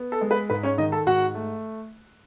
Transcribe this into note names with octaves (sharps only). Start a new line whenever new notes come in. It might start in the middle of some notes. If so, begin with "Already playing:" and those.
Already playing: B3
A4
G#3
B4
G#2 B4
C#4 C#5
D#3 D#4 D#5
A4 A5
G#2 F#4 F#5
A3